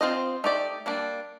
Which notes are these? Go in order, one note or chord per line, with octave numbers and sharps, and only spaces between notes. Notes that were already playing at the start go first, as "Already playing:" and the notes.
C4 F4 C5 D#5
A3 D#4 G4 D5
G3 A#3 D4